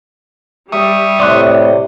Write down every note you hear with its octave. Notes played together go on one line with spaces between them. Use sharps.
G3 E5 C#6 D#6
A2 C3 D5 C6 F#6